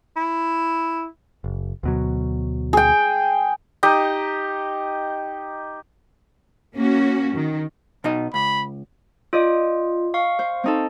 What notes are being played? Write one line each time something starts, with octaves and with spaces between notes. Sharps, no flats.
E4
F#1
D2 B2 F#3
G#4 G5
D#4 G4 D#5
A#3 C#4 F#4
D#3
B2 D#4 D#5
C#2 B5
F4 D5 D#5 D#6
F5 C#6
C5
C4 D#4 A4